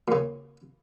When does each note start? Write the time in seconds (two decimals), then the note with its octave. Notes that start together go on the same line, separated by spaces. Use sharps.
0.08 A#2 C#3